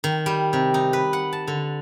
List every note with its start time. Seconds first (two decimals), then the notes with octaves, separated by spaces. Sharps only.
0.04 D#3
0.26 G3
0.53 C3
0.74 D#4
0.93 B4
1.13 F#5
1.33 A5
1.47 D3